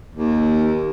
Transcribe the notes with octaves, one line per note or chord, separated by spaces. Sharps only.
D#2